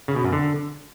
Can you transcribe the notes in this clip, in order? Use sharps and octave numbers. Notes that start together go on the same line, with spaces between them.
C#3
B2
F#2
D3